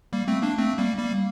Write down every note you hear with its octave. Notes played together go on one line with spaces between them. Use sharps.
G3 A#3
A3 C4
A#3 D4
A3 C4
G3 A#3
G3 A#3